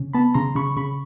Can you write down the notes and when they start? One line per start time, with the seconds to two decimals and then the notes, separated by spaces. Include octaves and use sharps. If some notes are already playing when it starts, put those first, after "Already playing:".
Already playing: C#3
0.13 B3 A5 B5
0.34 C#3 A#5 C6
0.55 C#3 B5 C#6
0.77 C#3 B5 C#6